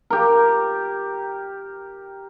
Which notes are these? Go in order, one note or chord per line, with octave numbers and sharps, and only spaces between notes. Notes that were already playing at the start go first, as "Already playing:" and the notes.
G4 A#4